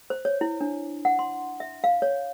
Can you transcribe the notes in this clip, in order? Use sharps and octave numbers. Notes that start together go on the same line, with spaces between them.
C5
C#5
E4
D4
F#5
C6
E5
F5
C#5